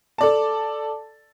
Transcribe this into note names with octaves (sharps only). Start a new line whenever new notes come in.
A4 D5 A5